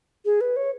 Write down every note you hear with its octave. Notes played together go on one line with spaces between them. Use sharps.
G#4
B4
C#5